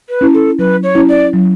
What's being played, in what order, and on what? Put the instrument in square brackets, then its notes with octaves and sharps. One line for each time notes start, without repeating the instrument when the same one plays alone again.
[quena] B4
[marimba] C#4 E4
[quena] A4
[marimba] F#3 [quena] B4
[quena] C#5
[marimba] C#4 E4
[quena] D5
[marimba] F#3